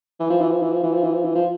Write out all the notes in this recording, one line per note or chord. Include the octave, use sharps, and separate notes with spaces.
E3
F3
E3
F3
E3
F3
E3
F3
E3
F3
E3
F3